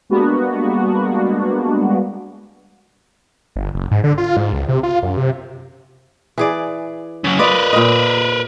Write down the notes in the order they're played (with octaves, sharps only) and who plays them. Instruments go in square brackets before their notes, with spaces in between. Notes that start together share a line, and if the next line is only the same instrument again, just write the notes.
[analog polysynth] G3 G#3 A#3 B3 D4 F#4
[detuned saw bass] G1
F#1
G#2
D3
F4
G#2
C#2
C3
F4
F#2
C3
[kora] E3 G#4 D5
[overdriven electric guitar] C#3 F#3
[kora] F4 D5 D#5 [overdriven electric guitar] A#4 B4
[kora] A#2 D#5